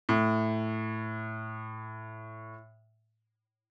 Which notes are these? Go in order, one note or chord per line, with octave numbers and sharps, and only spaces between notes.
A2